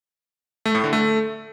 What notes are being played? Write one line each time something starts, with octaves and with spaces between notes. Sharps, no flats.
A3
A2
D3
A3